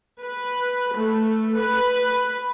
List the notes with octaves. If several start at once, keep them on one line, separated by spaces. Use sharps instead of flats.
B4
A3
B4